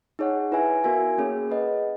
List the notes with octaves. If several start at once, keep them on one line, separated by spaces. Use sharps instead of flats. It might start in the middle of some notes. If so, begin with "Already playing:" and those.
D#4 G#4 C#5 F#5
E4 B4 E5 G#5
B3 F#4 A#4 E5 G#5
A#3 C#4 G#4 C#5
G#4 B4 D#5 F#5